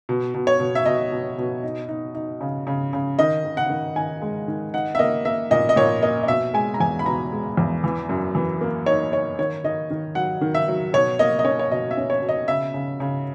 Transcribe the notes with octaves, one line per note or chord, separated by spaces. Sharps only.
B2
B2
C#5
B2
E5
B2 D#5
B2
B2
D#4
D#4
D#4
C#3
C#3
C#3
D#3 D#5
D#3
F#5
D#3
D#3 G#5
G#3
D#3
D#4 F#5
E5
A#3 D#5
A#3 E5
A#2 D#5
D#5
A#2 C#5
A#3 D#5
D#5
B2 E5
G#3 G#5
A#5
E2 G#5
B5
B2 A#5
G#3
E2
E3
F#2
E3
A#3
D#4 C#5
D#4 C#5
D#3 C#5
D#3 D#5
D#3
F#3 F#5
D#3
E5
F#3
B2 C#5
A#3 D#5
D#5
C#4 C#5
C#5
B2 D#5
E5
C#4
C#5
B2
D#5
C#3 E5
C#3
C#3